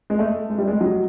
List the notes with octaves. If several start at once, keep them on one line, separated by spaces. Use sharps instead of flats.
G#3
A3
G#3
G3
G#3
F#3